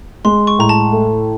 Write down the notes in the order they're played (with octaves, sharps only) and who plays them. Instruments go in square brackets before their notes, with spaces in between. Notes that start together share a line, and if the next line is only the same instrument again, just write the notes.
[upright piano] G#3 [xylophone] C6
[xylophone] C#6
[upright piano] A2 [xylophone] A#5
[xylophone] A5
[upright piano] A3